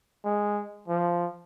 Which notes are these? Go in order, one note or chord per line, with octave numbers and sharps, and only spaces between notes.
G#3
F3